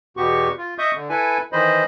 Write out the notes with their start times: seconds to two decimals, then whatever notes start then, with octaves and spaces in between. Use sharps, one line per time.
0.17 E2 B2 B3 F#4 G4 C#6
0.58 F4
0.78 D#5 E5 C#6 D#6 G6
0.95 D3
1.10 E4 A4 B4 G#5
1.53 D#3 E3 C5 D#5 B5